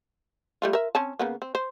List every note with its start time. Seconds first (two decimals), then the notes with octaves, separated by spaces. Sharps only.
0.62 G3 A3 F4
0.73 A#4 E5
0.95 C4 C#4 A5
1.19 C#3 A#3 B3
1.42 C4
1.55 C5